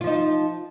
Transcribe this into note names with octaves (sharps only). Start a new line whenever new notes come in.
F3 D#4 F4